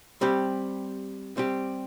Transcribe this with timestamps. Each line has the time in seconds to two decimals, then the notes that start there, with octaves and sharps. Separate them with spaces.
0.21 G3 C4 G4
1.37 G3 C4 G4